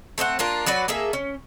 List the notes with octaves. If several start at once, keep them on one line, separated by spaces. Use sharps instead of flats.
A3 C4 E5 F#5
A#3 D4 F4 A#4
F#3 F#4 B4 D5
A#3 G#4 A4 E5
C#4